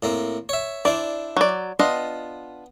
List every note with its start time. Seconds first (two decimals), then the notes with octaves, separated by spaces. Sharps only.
0.03 A2 A#3 C4
0.49 C#5 E5
0.85 D4 E4 C5 D5
1.37 F#3 D5
1.79 B3 D4 F4 D#5